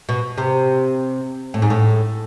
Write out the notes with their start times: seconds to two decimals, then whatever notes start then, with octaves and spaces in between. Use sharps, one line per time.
0.09 B2
0.38 C3
1.54 A2
1.62 G#2
1.70 A2